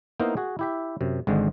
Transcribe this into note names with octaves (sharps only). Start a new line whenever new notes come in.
A#3 B3 D#4 E4 A#4 C5
F#4 G#4
E4 G4 E5
F#2 C3
G#1 G#2 D3 G#3